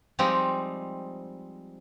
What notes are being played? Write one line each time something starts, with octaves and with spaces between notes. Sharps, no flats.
F3 G3 G#3 C4 D#4 G4